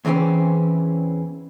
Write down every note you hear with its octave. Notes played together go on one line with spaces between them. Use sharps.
E2 C#3 E3 C4 C#4